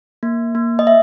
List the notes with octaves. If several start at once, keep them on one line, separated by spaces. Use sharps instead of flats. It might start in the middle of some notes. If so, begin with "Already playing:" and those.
A#3
A#3
D#5
E5